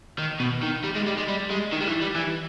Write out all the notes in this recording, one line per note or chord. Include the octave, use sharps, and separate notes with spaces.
D#3
B2
D#3
G3
G#3
G3
G#3
G3
G#3
D#3
G3
E3
G3
E3